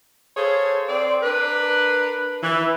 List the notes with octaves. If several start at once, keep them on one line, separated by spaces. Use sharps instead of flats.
G#4 A4 C5 C#5 F5
C4 C5 D5
D4 A#4 B4
E3